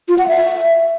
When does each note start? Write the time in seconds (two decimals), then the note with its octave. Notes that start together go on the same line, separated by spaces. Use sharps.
0.09 F4
0.18 F#5
0.28 E5